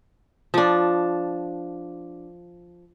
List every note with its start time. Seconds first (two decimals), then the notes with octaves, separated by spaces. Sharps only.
0.54 F3 D4